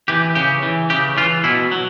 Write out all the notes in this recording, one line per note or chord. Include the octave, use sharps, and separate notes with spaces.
E3 G4
C#3 G4
E3
C#3 G4
E3 F4
B2 E4
F#3